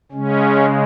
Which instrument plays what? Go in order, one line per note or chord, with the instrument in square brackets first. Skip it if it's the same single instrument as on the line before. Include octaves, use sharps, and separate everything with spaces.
[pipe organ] C#3 G#3 C#4